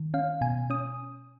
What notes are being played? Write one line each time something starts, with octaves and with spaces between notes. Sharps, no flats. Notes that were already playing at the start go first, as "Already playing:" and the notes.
Already playing: D#3
C#4 F5
B2 G#5
C#4 D#6